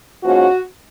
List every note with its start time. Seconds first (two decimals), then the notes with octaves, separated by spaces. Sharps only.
0.24 G#2 F3 A#3 C#4 F#4